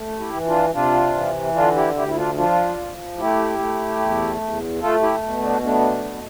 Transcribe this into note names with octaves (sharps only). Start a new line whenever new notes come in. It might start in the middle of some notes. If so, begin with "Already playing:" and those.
Already playing: A3
E4 G4
E3
D4 F4
C3 D4 F4
E3
D3 D4 F4
E4 G4
D2 E4 G4
E4
D4 F4
F3 D4 F4
F3
A3 E4 G4
A3
E2
E2
A3 F4 A4
E4 G4
B2
B3 D4
A3 B3 D4
B2